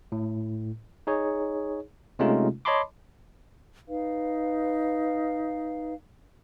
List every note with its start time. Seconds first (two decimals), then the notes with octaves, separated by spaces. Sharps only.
0.12 A2
1.07 D#4 G#4 C#5
2.19 C3 G#3 A3 C#4 D#4 F4
2.65 C#5 D#5 A5 B5 C6 D6
3.88 D#4 B4 F5